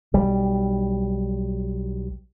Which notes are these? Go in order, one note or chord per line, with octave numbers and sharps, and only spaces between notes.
B1 G3